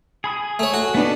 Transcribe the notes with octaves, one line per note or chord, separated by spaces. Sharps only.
G#4 B5 D#6
A3 C#5
F#4
A3 B3 D4 D#4